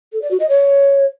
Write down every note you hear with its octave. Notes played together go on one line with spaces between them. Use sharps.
A4
D5
F#4
D#5
C#5